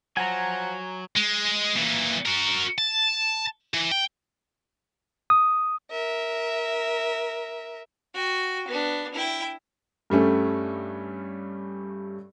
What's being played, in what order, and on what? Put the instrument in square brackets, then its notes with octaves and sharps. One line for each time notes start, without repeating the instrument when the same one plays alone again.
[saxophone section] F3 F#5 [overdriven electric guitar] F#3 [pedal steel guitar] G#5 A#5
[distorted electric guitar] G#3
A#2 E3
F#4 A#4
A5
E3
G5
[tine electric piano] D#6
[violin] A#4 E5
[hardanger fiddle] F#4 G5
B3 D4
E4 G5
[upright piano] G2 G3 A3 C#4